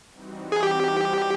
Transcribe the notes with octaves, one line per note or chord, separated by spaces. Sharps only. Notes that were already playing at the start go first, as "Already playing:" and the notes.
E3 G3 C4 D#4 F#4
G#4
G4